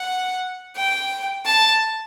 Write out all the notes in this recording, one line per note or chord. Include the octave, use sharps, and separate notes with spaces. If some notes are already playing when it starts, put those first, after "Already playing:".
Already playing: F#5
G5
A5